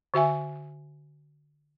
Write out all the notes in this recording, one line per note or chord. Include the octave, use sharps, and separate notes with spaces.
D3 F#4 E5 G#5